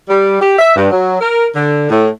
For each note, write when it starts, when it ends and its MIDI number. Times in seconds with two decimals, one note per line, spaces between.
0.08 0.38 55
0.40 0.56 67
0.58 0.75 76
0.76 0.89 43
0.91 1.20 54
1.21 1.48 70
1.54 1.86 50
1.90 2.07 45